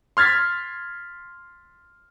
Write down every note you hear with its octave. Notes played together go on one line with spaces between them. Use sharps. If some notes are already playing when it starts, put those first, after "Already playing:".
C6 F6 G#6 A6 B6